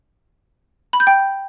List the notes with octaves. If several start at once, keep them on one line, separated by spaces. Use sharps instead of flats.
B5
G6
G5